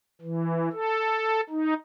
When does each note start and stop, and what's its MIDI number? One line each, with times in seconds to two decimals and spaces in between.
0.21 0.69 52
0.72 1.41 69
1.50 1.74 63